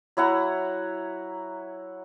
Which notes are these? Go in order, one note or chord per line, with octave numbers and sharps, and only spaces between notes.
F#3 E4 F#5 A#5